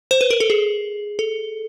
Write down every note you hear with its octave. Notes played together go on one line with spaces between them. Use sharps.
C5
B4
A#4
A4
G#4
A4